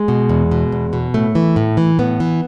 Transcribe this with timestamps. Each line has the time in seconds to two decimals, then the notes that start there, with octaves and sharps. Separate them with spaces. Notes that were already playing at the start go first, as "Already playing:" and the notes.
Already playing: G#3
0.08 B2
0.29 E2
0.51 B2
0.72 E2
0.93 B2
1.14 A2 A3
1.35 E3
1.56 A2
1.77 E3
1.99 A2 B3
2.20 E3